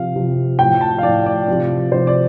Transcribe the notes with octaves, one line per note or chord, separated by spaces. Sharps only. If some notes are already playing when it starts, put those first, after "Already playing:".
Already playing: C3 F3 F5
C3 F3
A2 F3 G5
A5
F5
F3 D5
A2
D5
C3 F3
C3 F3 C5
D5